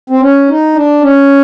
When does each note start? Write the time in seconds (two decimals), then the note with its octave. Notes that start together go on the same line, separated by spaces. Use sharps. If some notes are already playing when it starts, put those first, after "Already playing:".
0.10 C4
0.21 C#4
0.49 D#4
0.75 D4
1.02 C#4